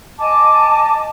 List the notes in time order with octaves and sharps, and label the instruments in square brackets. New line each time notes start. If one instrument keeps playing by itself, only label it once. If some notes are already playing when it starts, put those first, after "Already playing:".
[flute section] D#5 G#5 A5 D6